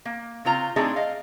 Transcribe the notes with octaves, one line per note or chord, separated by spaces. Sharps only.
A#3
C#3 C4 F4 A#5
A3 C4 D4 D#4 G#4
D#5 F5